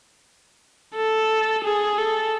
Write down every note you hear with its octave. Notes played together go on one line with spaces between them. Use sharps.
A4
G#4
A4